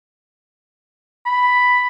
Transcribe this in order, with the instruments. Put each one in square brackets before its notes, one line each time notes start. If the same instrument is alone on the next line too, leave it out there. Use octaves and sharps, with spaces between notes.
[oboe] B5